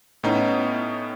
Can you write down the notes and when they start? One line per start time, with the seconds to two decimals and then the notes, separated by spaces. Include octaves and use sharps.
0.23 A2 B3 C#4 D#4